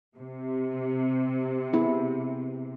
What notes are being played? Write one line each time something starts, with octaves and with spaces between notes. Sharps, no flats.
C3
B3 E4 G#4